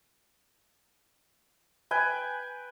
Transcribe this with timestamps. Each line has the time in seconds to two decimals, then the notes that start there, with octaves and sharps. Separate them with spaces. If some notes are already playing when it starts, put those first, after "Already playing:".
1.91 B4 G5 G#5